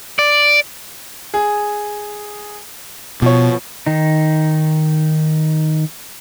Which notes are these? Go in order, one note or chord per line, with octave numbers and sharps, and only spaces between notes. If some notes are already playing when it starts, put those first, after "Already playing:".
D5
G#4
B2 F3 C#5
D#3 D#4